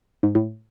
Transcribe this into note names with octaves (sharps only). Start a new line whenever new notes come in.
G#2
A2